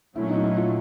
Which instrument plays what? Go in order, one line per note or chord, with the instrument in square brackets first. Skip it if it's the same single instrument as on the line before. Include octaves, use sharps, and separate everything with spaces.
[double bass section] A#2 F#3 A3 C#4 [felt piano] E4
[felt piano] D#4
E4
F4